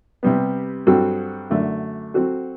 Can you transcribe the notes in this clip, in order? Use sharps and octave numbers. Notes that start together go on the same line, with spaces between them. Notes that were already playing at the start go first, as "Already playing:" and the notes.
C3 G3 B3
G2 F#3 C4 F#4 A4
F#2 D3 A3
F#3 C4 F#4 A4